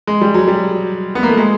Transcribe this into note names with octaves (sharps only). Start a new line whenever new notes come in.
G#3
G3
F#3
G3
B3
A#3
A3
G#3